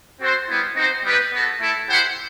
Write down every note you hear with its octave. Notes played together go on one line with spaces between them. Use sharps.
C4 F#4 A4 C5
G3 B3 E4
C4 D#4 F#4 C5
G3 B3 D#4 G4 B4
B3 F#4 A4
A3 E4 A4
E4 G4 C5 F#5